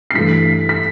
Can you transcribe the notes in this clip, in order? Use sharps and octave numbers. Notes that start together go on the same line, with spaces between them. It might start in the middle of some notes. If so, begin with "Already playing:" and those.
C7
G2 E3 A3 B6
B6